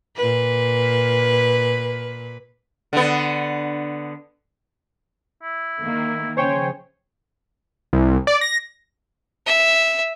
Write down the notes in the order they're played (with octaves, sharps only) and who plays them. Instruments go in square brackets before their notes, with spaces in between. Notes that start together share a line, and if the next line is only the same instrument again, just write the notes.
[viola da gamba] A#2 B4
[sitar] D3 B3
[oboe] E4
[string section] D#3 A#3
[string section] C#3 F3 [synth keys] C5 C#5 G5 [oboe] G#5
[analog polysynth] C2
D5
A#6
[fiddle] E5